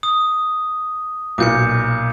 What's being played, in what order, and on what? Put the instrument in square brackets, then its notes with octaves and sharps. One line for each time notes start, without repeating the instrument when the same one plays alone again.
[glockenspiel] D#6
[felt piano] B1 A#2 [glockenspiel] D6 G6 C#7